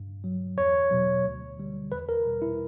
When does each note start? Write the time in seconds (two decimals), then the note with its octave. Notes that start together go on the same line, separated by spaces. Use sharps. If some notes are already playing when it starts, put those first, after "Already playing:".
Already playing: G2
0.24 F#3
0.57 E2 C#5
0.91 B2 F#3
1.25 D2
1.58 D3 G3
1.91 E2 B4
2.09 A#4
2.25 B2 G3
2.42 E4